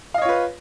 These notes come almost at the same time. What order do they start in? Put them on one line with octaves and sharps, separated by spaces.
F5 D#5 C#5 F4 B4